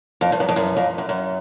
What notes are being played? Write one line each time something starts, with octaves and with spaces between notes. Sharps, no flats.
F2
G2
F#2
F2
F#2
F2
F#2
F#2